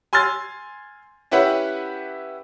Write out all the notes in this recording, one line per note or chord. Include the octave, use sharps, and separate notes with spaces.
G#5 C6 E6 F6 A6
C#4 E4 G4 B4 F#5